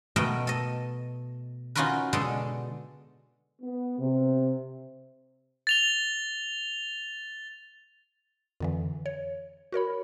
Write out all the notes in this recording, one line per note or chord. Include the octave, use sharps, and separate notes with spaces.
B2 A3 A#4 B4 D#5 G5
A4 D#5
C#4 D#4 F4 F#4 A#4 B4
B2 D3 G#3 A4
B3
C3
A6 F7 G7
F2 D3 E3
C#5
F#4 A#4 C#5 B5